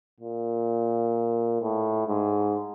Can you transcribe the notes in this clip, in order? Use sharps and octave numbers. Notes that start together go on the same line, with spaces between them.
A#2
A2
G#2